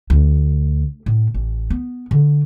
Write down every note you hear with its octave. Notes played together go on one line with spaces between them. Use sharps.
D2
A2
A1
B3
D3